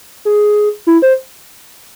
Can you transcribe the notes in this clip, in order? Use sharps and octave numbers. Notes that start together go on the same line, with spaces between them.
G#4
E4
C5